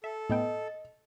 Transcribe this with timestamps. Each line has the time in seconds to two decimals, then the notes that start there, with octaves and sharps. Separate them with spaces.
0.04 A4 E5
0.30 A2 B3 D#5 G5